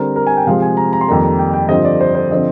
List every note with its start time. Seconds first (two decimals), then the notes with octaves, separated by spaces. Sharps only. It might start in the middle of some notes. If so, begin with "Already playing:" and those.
Already playing: D3 G3 C4 A#4
0.16 A#4
0.27 G#5
0.37 G5
0.47 C3 F3 G#3 C4 F5
0.62 G#5
0.77 A#5
0.93 A#5
1.01 C6
1.08 F2 D#3 G3 A#3 A#5
1.39 G5
1.53 G5
1.69 G2 D3 F3 C4 D#5
1.85 D5
2.01 C5
2.15 C5
2.30 D3 F3 C4 D#5